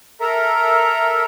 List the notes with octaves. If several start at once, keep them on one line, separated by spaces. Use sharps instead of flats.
A4 A#4 E5 A#5